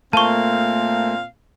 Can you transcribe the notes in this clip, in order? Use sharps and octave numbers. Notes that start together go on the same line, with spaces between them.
A#2 A3 A#3 C4 F5 A5 C#6